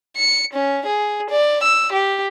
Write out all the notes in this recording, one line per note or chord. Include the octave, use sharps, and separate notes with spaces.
C#7
C#4
G#4
D5
E6
G4